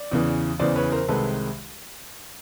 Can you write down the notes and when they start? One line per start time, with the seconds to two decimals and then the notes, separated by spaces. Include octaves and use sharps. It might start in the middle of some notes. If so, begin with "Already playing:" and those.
Already playing: D5
0.12 E2 C#3 E3
0.60 E2 C#3 E3 C5 D5
0.76 B4 C#5
0.92 A#4 C5
1.08 C2 C3 D#3 G#3 A4 B4